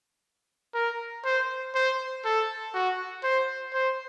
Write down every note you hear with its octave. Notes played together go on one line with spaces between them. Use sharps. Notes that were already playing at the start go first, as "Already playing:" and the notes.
A#4
C5
C5
A4
F#4
C5
C5